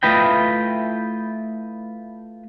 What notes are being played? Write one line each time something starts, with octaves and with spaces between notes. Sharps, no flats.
A3 E4 F4 B4 D#5 G5